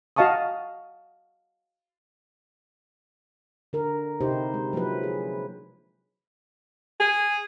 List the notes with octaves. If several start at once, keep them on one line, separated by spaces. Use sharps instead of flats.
F#4 D#5 F5 A5 C#6 D#6
D3 A#4
C3 D#4 E4 G4 C5
G#3
F3 F#3 A#3 E4 B4
G#4
G#4